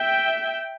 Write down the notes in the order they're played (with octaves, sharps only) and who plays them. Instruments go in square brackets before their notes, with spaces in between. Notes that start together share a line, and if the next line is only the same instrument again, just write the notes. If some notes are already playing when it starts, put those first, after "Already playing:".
Already playing: [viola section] E5 G5